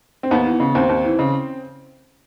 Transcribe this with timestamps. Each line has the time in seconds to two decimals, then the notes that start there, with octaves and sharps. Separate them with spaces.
0.23 C4
0.31 D#2 B3
0.46 E3
0.60 C#3
0.75 D#2 C4
0.89 D#2
1.05 E3
1.19 C#3